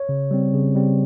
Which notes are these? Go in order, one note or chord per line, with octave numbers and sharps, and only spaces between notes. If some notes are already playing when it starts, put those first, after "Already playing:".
Already playing: C#5
C#3
G3 C4
C#3
G3 C4